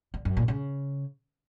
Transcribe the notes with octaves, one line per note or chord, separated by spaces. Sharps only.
D3
F#2
A#2
C#3